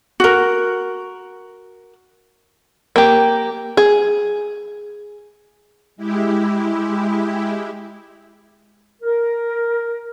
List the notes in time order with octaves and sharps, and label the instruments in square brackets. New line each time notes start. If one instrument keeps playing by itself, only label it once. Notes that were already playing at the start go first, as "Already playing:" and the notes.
[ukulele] F#4 A#4
[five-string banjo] A#3 G4
G#4
[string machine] G#3 E4 G4
[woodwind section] A#4